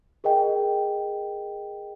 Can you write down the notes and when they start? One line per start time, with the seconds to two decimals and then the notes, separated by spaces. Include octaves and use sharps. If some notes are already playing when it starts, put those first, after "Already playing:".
0.24 G#4 A#4 D#5 G5